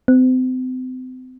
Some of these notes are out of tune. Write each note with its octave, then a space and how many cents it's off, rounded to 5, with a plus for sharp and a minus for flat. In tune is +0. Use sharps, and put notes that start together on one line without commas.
C4 -35